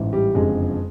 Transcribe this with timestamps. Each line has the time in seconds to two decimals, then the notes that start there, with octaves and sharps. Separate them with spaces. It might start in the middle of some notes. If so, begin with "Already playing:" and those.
Already playing: A1 G#2 E3
0.13 G3 G4
0.35 F#1 F2 D3 F3 G#3 G#4